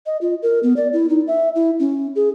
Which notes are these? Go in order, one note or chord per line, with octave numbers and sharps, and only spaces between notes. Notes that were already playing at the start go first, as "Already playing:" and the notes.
D#5
F4
A#4
B3
D5
E4
D#4
E5
E4
C#4
G#4